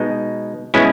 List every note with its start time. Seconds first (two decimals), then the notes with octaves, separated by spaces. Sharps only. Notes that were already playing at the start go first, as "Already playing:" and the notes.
Already playing: B2 G#3 D#4
0.74 B2 G#3 C#4 E4